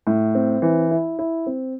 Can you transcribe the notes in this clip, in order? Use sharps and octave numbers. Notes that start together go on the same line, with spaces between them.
A2
C4
E3
E4
E4
C4